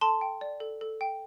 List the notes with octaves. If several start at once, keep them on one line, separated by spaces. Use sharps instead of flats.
A4 A5 C6
G5
D5
A4
A4
G5